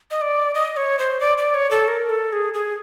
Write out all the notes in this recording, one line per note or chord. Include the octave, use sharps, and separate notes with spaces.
D#5
D5
D#5
C#5
C5
D5
D5
C#5
A4
A#4
A4
G#4
G#4